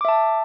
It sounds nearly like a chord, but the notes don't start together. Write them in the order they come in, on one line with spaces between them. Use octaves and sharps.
D6 E5 A5